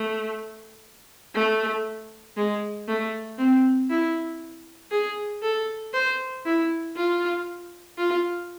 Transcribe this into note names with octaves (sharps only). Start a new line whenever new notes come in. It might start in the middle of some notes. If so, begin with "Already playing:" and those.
Already playing: A3
A3
G#3
A3
C4
E4
G#4
A4
C5
E4
F4
F4